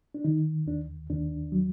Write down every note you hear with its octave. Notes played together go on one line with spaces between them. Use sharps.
D4
D#3 D#4
D#2 D4
D#2 D4
F#3